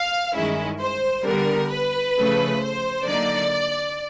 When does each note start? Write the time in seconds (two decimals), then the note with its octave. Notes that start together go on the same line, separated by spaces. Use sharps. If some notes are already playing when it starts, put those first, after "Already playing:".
Already playing: F5
0.34 G2 D#3 G#3 C#4 E4
0.79 C5
1.25 D3 G3 B3 A#4
1.70 B4
2.16 C#3 F3 A3
2.61 C5
3.06 D3 F#3 A#3 D#4 D5